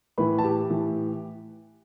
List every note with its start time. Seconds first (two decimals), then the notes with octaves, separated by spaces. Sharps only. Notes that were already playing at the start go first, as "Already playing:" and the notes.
0.18 A2 E3 B4 B5
0.39 A5
0.43 G4 G5
0.69 A2 E3